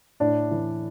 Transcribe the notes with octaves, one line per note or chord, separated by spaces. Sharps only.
A2 D4 D5
E3